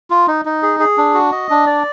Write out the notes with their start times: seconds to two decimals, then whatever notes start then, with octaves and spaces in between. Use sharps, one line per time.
0.10 F4
0.28 D#4
0.45 D#4
0.63 G#4
0.80 G#4
0.98 D4
1.14 F#4
1.32 D#5
1.50 D4
1.66 D5